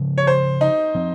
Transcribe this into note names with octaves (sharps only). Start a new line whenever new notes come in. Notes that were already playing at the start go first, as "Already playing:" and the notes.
Already playing: C#3 F3 G#3
C#5
C5
D#4
F3 C4